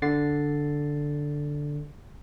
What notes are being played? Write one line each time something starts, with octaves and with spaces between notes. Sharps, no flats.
D3 A6 C7